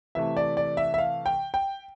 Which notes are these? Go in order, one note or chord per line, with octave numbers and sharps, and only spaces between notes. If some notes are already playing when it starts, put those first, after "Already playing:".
C3 E3 A3 E5
D5
D5
E5
E5
F5
G5
G5